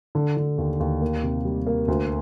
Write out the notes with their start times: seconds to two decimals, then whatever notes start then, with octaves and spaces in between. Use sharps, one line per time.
0.15 D3
0.37 D3
0.58 D#2
0.80 D#2
1.01 A#3
1.23 C3
1.45 G3
1.67 A#3
1.88 D2